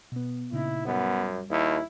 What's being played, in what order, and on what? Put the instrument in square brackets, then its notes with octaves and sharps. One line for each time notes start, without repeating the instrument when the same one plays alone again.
[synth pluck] B2 B3
[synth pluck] A#2 C#3 D#4 [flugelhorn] E4
[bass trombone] F#2 [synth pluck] G3 [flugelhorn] B3
[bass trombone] D#2 [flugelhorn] E4